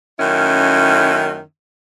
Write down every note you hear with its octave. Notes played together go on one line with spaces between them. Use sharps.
F#2 D#3 A3 C#4 E4